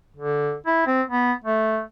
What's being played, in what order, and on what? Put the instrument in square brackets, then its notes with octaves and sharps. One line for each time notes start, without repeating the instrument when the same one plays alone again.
[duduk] D3
E4
C4
B3
A3